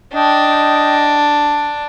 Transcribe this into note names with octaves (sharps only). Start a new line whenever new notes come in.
D4 D#5 G5